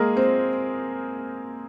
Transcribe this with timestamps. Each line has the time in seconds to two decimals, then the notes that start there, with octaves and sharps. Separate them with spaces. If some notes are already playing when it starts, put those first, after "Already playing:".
Already playing: G#3 A#3 G#4 A#4
0.16 C4 C5